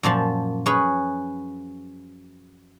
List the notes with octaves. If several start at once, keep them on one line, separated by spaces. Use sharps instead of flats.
F#2 A#2 F3 A5
C#4 G#4 B4